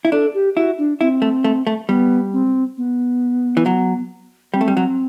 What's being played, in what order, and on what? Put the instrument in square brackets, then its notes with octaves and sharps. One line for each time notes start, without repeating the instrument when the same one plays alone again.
[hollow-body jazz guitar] E4
[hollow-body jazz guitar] D4 [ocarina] A4
[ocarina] G4
[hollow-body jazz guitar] E4 [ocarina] F#4
[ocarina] D4
[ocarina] C4 [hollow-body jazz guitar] E4
[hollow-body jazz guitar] A3
A3
A3
[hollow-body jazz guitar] G3 [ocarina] B3
[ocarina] C4
B3
[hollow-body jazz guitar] E3
F#3
[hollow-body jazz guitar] G3 [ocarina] C4
[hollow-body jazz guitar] A3
G3
F#3